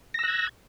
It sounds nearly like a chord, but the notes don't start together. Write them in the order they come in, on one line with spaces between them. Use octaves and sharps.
A#6 E6 F#6 G#6